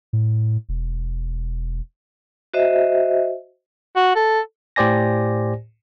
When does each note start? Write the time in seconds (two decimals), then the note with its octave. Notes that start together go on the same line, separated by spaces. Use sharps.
0.13 A2
0.69 E1
2.54 F#4 C5 D#5 E5
3.96 F#4
4.16 A4
4.76 A2 G4 C5 D5 G#5 A#6